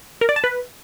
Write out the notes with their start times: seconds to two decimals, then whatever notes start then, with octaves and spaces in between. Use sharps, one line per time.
0.21 A#4
0.29 D5
0.36 A5
0.44 B4